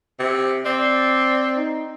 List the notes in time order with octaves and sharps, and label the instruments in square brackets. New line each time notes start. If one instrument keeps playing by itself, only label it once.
[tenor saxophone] C3
[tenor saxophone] C4 [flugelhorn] D5
[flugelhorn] D#4